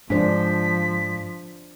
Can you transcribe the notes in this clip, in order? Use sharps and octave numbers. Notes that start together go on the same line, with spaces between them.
G#2 F3 D4 C5 B6